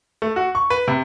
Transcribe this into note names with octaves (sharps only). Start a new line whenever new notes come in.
A3
F#4
C#6
B4
C3